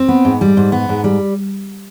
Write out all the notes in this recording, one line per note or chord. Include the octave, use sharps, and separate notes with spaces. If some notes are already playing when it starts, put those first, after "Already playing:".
Already playing: C4
B3
G#2
G3
G#2
B3
G#2
G3